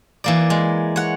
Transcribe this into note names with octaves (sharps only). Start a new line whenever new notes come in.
E3 A#3 D5
G#3
C#5 F#5